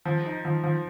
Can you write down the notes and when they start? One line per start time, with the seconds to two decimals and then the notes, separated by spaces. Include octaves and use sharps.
0.06 F3
0.25 D#4
0.45 F3
0.64 F3